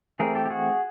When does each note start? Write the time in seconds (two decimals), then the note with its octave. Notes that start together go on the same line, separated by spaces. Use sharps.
0.19 E3 A3 C4 G#4 A#4
0.35 G4 A4
0.46 G4
0.50 F#4 G#4